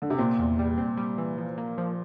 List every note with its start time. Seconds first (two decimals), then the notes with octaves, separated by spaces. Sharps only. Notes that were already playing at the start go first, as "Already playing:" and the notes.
0.02 D3
0.10 C3
0.18 A#2 C4
0.39 E2
0.59 G3
0.78 C4
0.97 G3
1.18 E3
1.38 F3
1.58 A#3
1.78 F3